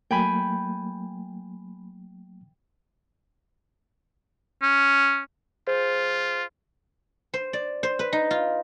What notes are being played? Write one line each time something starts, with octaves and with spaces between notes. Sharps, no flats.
F#3 A3 A#3 G5 G#5 B5
C#4
F4 G#4 C5
C5
D5
C5
B4
D#4
F4